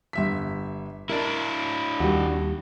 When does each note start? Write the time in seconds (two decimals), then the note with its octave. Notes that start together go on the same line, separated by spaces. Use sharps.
0.13 G1 E5 B6
1.09 D4 E4 A#4
2.00 D#2 G3 F#4